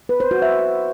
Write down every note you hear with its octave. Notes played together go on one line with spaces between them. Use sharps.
B4
C5
F#4
E5